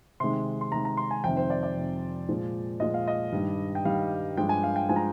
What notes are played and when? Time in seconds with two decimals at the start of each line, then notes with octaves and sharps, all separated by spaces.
0.20 C3 D#3 G#3 C6
0.61 C6
0.71 C3 D#3 G#3 A#5
0.85 A#5
0.97 C6
1.11 G#5
1.24 F2 C3 D#3 G5
1.37 C5
1.50 D5
1.63 D5
1.77 F2 C3 D#3
2.28 A#2 F3 G#3
2.80 A#2 F3 G#3 D#5
2.94 F5
3.08 D#5
3.32 G2 D#3 G3
3.75 G5
3.85 G2 D#3 G3 F5
4.37 G2 F3 G#3 G5
4.49 G#5
4.63 F5
4.76 G5
4.89 F3 G#3 G#5
4.96 A#5